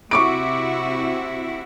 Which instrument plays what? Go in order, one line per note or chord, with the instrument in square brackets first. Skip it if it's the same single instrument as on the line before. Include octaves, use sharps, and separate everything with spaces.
[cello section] C3 E4 F#4 [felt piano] C#6 D6 D7